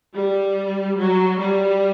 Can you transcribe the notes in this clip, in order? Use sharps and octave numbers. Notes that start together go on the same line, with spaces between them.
G3
F#3
G3